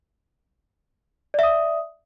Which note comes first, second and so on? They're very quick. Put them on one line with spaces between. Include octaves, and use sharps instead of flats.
D5 E5 D#6